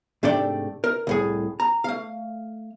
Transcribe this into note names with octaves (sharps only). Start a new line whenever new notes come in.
G#2 C3 A3 D4 D5 G5
A#4
C2 A2 G#4
A#5
A3 F5